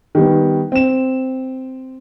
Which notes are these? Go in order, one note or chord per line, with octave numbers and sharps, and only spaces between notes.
D#3 G3 B3
C4 E7